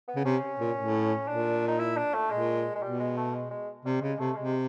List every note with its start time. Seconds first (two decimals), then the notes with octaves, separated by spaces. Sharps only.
0.08 B3
0.16 C#3
0.25 C3 C#4
0.60 A#2
0.77 A2
1.28 A#2 D4
1.68 D#4
1.79 E4
1.97 D4
2.14 A3
2.31 A#2 G#3
2.75 G#3
2.82 B2 G3
2.99 G#3
3.17 A3
3.34 G#3
3.51 G#3
3.85 C3 G3
4.02 C#3 G#3
4.19 C3 A3
4.36 C3 G#3